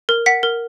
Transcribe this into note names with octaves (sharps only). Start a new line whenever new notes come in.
A#4
F#5 B6
A#4